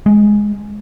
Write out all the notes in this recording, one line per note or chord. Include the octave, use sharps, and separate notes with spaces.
G#3